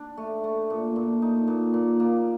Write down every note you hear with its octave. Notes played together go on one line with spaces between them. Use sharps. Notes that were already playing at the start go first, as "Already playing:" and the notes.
Already playing: D4
A3
A3
A#2
A#2
D#4
A#2
A#2
A#3